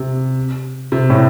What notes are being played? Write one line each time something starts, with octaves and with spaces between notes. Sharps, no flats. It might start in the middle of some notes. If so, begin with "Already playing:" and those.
Already playing: C3
C3
A2